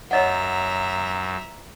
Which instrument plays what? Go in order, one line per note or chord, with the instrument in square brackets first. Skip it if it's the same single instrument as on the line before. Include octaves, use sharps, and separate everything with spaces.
[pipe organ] F#2 [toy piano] C#5 D#5 F#5 [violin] E5 A#5